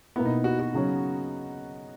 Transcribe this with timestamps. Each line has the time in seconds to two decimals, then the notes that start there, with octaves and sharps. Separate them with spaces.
0.16 B2 A#3 B3 E4
0.25 D#4
0.44 F#4
0.59 F#4
0.74 C#3 F#3 C#4